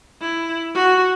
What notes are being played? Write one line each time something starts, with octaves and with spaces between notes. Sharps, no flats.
E4
F#4